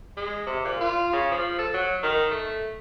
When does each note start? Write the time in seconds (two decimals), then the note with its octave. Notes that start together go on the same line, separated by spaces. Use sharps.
0.17 G#3
0.47 C3
0.65 A#2
0.81 F4
1.13 C#3
1.32 F3
1.59 A4
1.74 F#3
2.03 D#3
2.31 A3